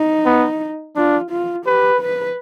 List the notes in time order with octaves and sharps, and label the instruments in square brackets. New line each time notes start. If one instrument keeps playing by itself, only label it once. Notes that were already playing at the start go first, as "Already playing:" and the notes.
Already playing: [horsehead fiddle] D#4
[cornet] B3
[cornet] D4 [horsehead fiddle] F4
[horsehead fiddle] F4
[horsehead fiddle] G4 [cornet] B4
[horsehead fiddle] B4